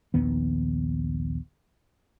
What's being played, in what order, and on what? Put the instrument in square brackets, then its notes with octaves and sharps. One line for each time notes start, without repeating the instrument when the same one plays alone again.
[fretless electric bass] A#1 D#2 D#3 B3